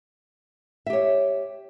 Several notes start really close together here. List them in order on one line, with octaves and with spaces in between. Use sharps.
E5 G4 C#5